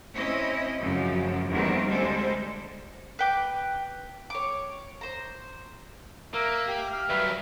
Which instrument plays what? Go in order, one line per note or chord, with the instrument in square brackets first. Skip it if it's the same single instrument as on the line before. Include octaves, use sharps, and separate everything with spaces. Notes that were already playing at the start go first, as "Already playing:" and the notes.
[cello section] C4 C#4 E4 D#5
F#2 C#3 F3 A3
E2 D#3 G3 A#3 C4
D2 G3 G#3 A4 C5
[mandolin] B4 G5 D6
C#5 D6
C5 A#5
[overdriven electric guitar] A#3 [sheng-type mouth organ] A#4 [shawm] E5
[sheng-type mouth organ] G4
[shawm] F5
[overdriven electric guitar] G2 F#3 [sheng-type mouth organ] B4 E5